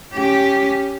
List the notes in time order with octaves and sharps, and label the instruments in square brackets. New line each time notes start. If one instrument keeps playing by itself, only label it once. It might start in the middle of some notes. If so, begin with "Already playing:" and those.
[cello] C#4 G4